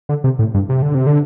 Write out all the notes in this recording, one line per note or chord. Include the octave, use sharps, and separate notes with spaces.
D3
C3
A2
G2
C3
D3
C3
D3